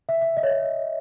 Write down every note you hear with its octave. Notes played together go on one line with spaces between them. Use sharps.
E5
E5
D#5
C#5
D#5